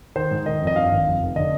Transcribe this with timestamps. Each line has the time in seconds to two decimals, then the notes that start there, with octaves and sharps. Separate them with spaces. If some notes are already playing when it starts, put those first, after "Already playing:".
0.16 D#3 C5
0.31 G#2
0.46 D#3 D#5
0.61 F2
0.67 D#5
0.76 G2 F5
0.91 G#1
1.06 F2
1.21 F1
1.36 D3 D#5